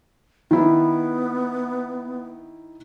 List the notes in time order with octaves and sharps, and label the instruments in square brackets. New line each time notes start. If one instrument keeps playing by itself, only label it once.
[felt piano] D#3 E4 [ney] B3